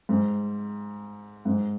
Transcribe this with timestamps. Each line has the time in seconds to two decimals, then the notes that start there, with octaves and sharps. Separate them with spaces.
0.09 G#2
1.45 G#2